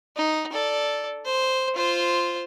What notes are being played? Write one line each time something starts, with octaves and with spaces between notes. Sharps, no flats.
D#4
A4 D5
C5
F4 C5